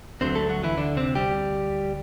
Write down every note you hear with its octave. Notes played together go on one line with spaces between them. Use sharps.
D2 D3 F#3 C4 C5
A3 A4
F#3 F#4
E3 E4
D3 D4
C3 C4
G3 G4